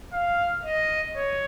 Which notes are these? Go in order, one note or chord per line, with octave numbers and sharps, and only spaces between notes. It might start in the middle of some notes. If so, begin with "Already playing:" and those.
F5
D#5
C#5